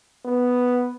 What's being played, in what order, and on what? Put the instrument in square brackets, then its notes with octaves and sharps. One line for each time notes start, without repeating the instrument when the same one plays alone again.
[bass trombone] B3